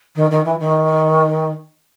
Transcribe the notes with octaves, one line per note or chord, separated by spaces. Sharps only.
D#3
D#3
E3
D#3